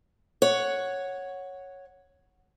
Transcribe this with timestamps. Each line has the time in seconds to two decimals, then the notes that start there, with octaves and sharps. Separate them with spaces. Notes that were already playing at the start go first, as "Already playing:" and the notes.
0.42 C#5 F#5